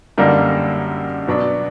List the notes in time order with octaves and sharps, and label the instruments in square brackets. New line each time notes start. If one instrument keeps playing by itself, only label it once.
[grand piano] F#2 D3 G3 A#3 D#4
B2 F#3 B3 D4